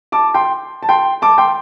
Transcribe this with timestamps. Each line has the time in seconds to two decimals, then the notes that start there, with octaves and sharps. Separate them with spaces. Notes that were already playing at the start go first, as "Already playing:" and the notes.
0.12 A5 D6
0.34 G5 C6
0.83 A5
0.89 G5 C6
1.22 A5 D6
1.38 G5 C6